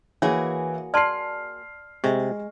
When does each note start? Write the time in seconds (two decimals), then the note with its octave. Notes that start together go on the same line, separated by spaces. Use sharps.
0.22 E3 A#3 F#4 G#4 C#5
0.94 D5 A5 C6 F6 C7
2.04 C3 G#3 C#6